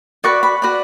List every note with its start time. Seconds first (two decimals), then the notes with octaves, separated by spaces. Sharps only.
0.24 F#4 B4 D5 C#6
0.43 B5
0.62 F#4 B4 D5